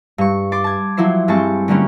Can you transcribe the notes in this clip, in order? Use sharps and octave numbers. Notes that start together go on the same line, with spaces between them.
G2 C#6
C6 D6 A6
A5 G#6
F3 F#3 E4 C5 C7
G2 G3 G#3 C4 A5 C#6
D3 F#3 G3 A3 A#3 C#4